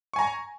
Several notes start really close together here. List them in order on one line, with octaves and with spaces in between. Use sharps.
C#6 G#5 A#5